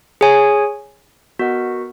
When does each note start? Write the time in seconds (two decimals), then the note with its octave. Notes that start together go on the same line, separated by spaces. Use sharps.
0.21 G#4 C#5 G#5
1.39 B3 F#4 A#4 D#5 F#5